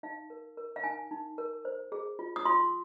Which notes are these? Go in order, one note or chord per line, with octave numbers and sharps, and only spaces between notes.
D#4 F5
A#4
A#4
F5
D#4 G#5
D#4
A#4
C5
G#4
F4
D#6
F4 C6